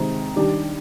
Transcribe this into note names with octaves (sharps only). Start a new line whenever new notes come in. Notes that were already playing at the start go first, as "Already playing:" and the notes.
Already playing: C3 D#3 G#3 C4 D#4
D#3 G3 D4 G4